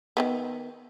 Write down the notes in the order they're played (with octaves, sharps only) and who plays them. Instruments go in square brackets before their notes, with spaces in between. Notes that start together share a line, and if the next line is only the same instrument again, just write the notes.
[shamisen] D#3 F#3 B3